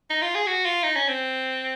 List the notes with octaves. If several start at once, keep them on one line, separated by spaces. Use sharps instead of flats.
D#4
F4
G#4
F#4
F4
D#4
C#4
C4